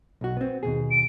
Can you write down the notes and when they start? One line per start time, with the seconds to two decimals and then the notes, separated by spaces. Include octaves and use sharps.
0.21 B1 F#4
0.37 B3 C4
0.63 D#2 B2 G#4
0.91 D7